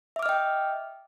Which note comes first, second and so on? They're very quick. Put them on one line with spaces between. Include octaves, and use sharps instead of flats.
E5 D6 F6 D#5 G5